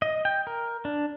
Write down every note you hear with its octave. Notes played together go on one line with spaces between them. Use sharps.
D#5
G5
A#4
D4